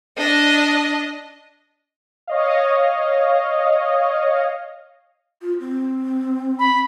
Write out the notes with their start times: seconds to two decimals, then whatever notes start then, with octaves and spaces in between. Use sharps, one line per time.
0.18 D4 D#5
2.27 C#5 D#5 F5
5.42 F4
5.60 C4
6.59 B5